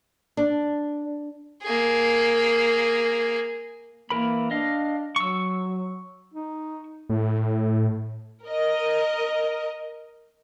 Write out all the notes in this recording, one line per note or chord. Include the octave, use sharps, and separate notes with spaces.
D4
A#3 G#4
E3 A#3 A#4 B5
D4 D#5 F5
F#3 C#6 E6
D#4
A2
A#4 D#5